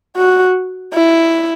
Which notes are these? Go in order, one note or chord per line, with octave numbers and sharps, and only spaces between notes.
F#4
E4